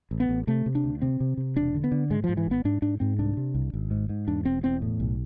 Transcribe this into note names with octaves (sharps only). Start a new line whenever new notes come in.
A1
B3
A1
C3 A3
C3
D4
D2
C3 C4
C3
C3
E1 D4
D3
B3
D3
G#2 G#3
F3
G#2
E3
G#1 B3
G#2 D4
G#2 D4
G#2 C4
C2 D4
C3
C2
G#1
G#2
G#2
E2 D4
E1 C4
E2 C4
A2
B1